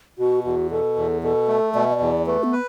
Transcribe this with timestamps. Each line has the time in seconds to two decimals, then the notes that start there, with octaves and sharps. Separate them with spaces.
0.19 B2 F#4
0.44 E2 F#4
0.71 B2 A4
0.97 E2
1.23 B2 A4
1.48 A3
1.74 B2 D5
1.84 E5
1.92 D5
2.01 E2
2.26 A3 B4
2.43 B3
2.52 B4